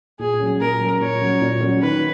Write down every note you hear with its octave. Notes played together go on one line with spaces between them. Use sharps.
A#2 G#4
F#3 C#4
A#2 A#4
F#3 C#4
A#2 C#5
F#3 C#4
A#2
F#3 C#4
D#3 B4